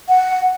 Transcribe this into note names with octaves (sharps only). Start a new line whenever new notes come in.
F#5